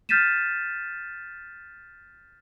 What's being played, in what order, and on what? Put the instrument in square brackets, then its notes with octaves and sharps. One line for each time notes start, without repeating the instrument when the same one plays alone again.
[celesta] F6 G6 A6 B6 D#7 E7